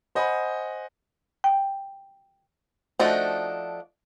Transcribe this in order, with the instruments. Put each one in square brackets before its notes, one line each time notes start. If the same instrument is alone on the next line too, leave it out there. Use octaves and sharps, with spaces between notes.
[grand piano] C5 D#5 F#5 G#5 B5
[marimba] G5
[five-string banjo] F3 A3 D4 D#4 F#4